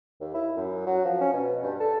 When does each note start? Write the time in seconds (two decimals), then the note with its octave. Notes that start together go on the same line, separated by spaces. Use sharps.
0.21 D#2
0.34 E4
0.56 F#2
0.86 F#3
1.05 F3
1.21 C#4
1.33 B2
1.63 G2
1.80 A4